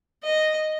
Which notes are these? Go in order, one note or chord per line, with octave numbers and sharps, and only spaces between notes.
D#5